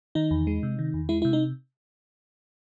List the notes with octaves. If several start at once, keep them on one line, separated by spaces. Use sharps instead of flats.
D#3 D#4
E2
G#3
C3
D#3
E2
G#3 E4
C3 E4
D#4